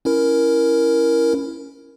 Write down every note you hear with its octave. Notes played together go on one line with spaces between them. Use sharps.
C#4 E4 A#4